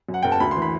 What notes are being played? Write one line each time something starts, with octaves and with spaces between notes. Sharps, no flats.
F#2
F#5
F#1 G5
A5
D2 B5
C6
E3
B5